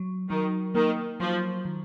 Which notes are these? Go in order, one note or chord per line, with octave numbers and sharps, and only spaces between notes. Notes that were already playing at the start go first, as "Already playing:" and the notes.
Already playing: F#3
D#3 F#3
D#3 A#3
F3 F#3
D#3